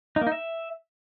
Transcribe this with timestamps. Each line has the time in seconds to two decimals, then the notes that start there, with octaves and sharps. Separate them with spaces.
0.16 D#4
0.21 A#3
0.27 D#4
0.32 E5